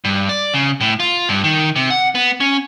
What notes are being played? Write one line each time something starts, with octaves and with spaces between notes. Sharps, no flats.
G2
D5
C#3
A2
F4
G2
D#3
C3
F#5
B3
C#4